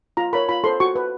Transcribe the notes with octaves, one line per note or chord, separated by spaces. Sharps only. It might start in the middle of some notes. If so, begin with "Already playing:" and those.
F4 A#5
A#4 C#5 B5
F4 B5
A4 C5 C6
F#4 C#6
B4